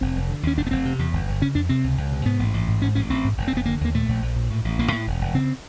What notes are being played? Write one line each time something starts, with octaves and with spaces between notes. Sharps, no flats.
F1 C4
F1
D3
D#2 C#4
F1 D4
B3
F1 C4
C3
E2
G1
G1
C#3 C#4
F2 D4
C3 C4
C#2
C#2
C3
G#2 B3
A1
A1
G#2
G#2 C#4
A1 C#4
A1 C4
G#2
F1
F1 C4
B3
D3 A#3
D#2 A#3
A#2 A3
A#1
A#1
A#2
A2
A1
A1 A#3
A2
E1
E1
C#3 C4